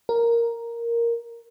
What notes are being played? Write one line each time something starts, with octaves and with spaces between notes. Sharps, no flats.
A#4